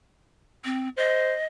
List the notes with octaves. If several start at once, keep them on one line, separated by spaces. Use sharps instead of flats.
C4
C5 D#5